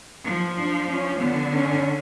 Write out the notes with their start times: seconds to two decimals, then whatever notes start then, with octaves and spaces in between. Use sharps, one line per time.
0.25 F3
0.57 D4
0.89 C#4
1.20 D3 B3
1.53 C#4